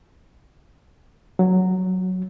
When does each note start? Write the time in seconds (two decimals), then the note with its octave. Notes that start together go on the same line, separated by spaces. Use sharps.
1.39 F#3